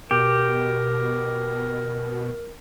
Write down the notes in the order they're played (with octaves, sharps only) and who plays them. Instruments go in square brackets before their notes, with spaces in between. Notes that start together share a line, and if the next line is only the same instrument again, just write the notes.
[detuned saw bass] B2 [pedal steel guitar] G4 [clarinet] A#4